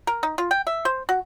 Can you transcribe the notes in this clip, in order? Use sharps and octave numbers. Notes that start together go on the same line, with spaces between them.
A#4
D#4
F4
G5
E5
C5
F#4